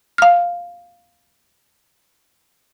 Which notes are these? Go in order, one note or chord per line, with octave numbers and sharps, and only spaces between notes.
F5 F6